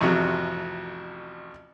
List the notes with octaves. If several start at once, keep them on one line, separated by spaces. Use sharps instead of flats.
A1 F2 C3 F#3